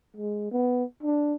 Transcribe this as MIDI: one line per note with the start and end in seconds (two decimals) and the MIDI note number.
0.17 0.52 56
0.52 0.84 59
1.03 1.35 62